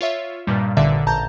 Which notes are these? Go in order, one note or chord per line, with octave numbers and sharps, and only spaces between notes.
F4 C#5 E5
G2 A#2 D#3 G3
A1 A#2 D3 D5 E5
A1 A5 A#5 G6